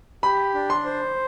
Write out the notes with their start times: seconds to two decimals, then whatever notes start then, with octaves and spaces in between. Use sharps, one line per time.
0.23 G4 B5
0.55 D4
0.70 C6
0.85 C5